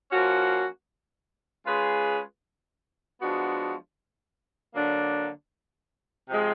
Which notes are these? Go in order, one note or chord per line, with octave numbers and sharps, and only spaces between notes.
F3 A#3 C#4 F#4
G#3 C#4 F4 G#4 B4
F3 G#3 B3 D4 F#4
D3 F#3 A#3 D4
C3 F3 G#3